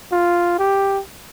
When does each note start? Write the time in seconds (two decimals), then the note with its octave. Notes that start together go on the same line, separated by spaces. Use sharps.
0.12 F4
0.59 G4